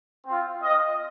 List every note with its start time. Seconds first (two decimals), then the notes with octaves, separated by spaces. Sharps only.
0.26 C4 F4
0.62 C4 F4 D#5